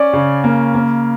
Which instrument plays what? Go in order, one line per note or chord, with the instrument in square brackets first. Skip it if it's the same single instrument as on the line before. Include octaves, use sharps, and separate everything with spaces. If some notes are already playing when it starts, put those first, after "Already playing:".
Already playing: [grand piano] C#4 [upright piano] D5
[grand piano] C#3
A#3
A#3